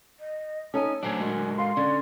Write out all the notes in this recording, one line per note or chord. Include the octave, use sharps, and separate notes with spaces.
D#5
C#4 D#4 A4 G#5 D#6
D2 D3 F#3 D4 C5 C#5 G#5
G#3 F#4 A#4
F5 C6
D3 C#4 D5